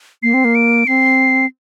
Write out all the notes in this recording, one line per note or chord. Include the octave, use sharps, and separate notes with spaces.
A#3 C7
C4
A#3
D7
C4 C7